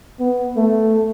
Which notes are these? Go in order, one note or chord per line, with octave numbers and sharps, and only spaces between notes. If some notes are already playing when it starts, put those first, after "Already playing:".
B3
A3